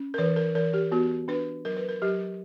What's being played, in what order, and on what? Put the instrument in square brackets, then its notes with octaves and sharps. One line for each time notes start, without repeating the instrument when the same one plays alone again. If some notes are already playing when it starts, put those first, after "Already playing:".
Already playing: [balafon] C#4
A#4
E3 B4
A#4
E3 A#4
G4
B3 F#4
D4 B4
F#3 A#4
B4
A#4
F#3 G4